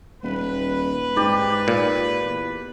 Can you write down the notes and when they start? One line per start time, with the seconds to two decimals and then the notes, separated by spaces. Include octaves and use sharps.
0.23 D#1 B4
1.16 G#2 G4 D5
1.68 A#2
2.25 E2